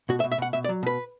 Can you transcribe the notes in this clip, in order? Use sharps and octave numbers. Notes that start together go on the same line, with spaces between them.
B2 F#4
E5
B2
E5
B2 F#5
B2 E5
D5
F#3
B2 B4